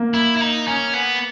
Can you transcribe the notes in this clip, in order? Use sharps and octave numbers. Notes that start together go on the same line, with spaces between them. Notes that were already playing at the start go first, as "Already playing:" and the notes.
Already playing: A#3
E4
E4
D#4
C#4
B3